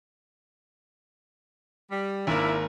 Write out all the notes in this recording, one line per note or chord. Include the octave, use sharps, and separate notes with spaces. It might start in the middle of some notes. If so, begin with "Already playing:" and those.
G3
G#1 A#3 D4 E4 A#4